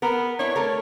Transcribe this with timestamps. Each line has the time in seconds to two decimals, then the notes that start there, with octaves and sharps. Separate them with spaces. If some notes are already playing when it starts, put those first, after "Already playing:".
0.02 B3 A#4
0.39 D4 E4 C#5
0.56 A3 A4 A#4